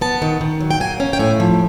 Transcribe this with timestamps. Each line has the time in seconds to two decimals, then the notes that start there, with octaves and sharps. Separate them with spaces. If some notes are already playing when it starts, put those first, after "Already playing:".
0.01 B3 A5
0.22 D#3
0.41 D#3
0.60 F#3
0.71 G5
0.80 A#3 G#5
1.00 C#4
1.13 G5
1.19 A2 G#5
1.40 F3